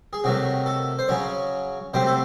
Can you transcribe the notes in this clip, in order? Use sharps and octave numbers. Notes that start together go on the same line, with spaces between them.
G#4
C3 D#3 F#3 A3 F#4
A4
C5
C#3 F#3 C#4 C#5
C3 F#3 A3 C4 C5
A4